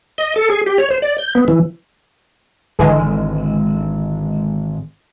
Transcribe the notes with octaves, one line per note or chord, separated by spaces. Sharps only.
D#5
A4
G#4
G4
C#5
C5
D5
G6
B3
E3
G#1 D3 E3 G#3